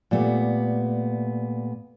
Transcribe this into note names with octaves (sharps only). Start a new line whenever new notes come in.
A#2 G3 A3 B3